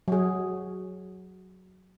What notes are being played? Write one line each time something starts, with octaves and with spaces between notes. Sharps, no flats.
F#3 G#4